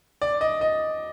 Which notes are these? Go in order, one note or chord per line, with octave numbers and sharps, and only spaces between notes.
D5
D#5
D#5